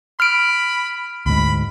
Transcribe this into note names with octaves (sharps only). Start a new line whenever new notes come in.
B5 F6 D7
D2 G#2 B5